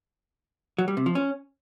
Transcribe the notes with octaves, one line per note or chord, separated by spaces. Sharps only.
F#3
G3
C3
F3
C#4